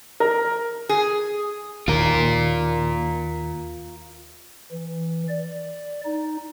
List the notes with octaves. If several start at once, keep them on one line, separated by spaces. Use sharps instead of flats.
A#4
G#4
D#2 F4 A#4
E3
D5
D#4